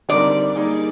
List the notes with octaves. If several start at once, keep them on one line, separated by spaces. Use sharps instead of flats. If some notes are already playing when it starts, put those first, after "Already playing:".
D3 G3 C4 D#4 A#4 D5
G3 A#3 D#4 G#4